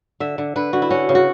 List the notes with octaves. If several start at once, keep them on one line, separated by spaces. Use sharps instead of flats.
D3 E5
D3
D3 B4
D3 F#4
E4
C#4 F#4
C#3
F#4